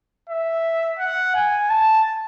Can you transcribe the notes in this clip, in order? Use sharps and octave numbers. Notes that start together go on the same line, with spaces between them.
E5
F#5
G#5
A5